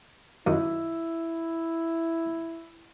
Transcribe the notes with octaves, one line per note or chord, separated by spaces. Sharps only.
F#2 D#3 E4